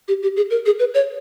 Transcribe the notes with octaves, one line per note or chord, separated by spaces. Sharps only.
G4
G4
G#4
A#4
G#4
B4
C#5